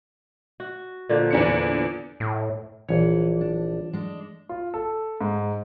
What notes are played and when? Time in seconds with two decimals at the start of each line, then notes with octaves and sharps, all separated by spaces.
0.60 F#4
1.09 A#2 D3 F3
1.31 E2 D4 C#7
2.20 A2
2.89 A#1 E3 C#5
3.41 D4
3.93 G#3 D4
4.49 F4
4.74 A4
5.21 G#2